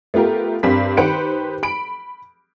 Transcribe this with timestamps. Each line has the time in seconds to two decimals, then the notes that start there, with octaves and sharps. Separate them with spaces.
0.14 A3 B3 F4 G4 A#4
0.63 G2 C4 A#4 B5 B6
0.97 D#3 G4 B4 C5 C#7 D7
1.63 B5 D7